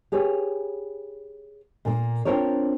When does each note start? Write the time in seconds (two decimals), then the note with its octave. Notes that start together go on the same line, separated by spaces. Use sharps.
0.12 G4 G#4 B4 C#5
1.85 A#2 A#3
2.25 C4 D4 F4 A#4 C5 C#5